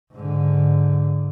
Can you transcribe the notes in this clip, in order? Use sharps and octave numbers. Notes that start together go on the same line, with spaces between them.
G#2 D3